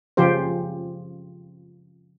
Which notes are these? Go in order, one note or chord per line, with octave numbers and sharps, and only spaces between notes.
C#3 F3 F4 G4 C5